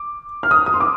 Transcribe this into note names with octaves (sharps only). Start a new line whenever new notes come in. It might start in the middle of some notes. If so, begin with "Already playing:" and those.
Already playing: D6
F6
D#6
D#6
C6
D6